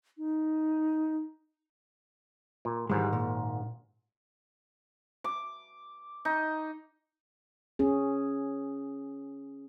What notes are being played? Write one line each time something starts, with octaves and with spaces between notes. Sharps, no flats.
D#4
A#2
G#1 G#2 E3 G3 G#3
A#2
D6
D#4
C#4 G#4